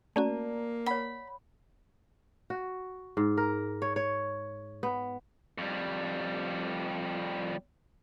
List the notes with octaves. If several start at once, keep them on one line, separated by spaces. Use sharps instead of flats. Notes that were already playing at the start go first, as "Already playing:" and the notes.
A3 A#3 C#4 F#4 D5 A5 A#5
C#5 F#5 B5
F#4
G#2
A#4
C#5
C#5
B3
F2 G3